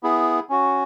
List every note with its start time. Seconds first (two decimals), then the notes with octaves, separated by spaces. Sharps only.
0.03 B3 E4 G#4
0.49 C#4 F#4